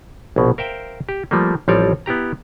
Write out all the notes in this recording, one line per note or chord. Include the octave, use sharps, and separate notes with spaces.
A#1 B2
A#4 C5 E5 F5 G5
G4
F3 G3 A3 A#3
A1 F3 G3 C4 C#5 D5
B3 E4 G4 A#5